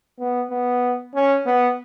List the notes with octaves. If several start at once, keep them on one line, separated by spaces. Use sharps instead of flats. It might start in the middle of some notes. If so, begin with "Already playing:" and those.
B3
B3
C#4
B3